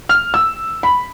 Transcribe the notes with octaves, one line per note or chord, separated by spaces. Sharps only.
F6
E6
B5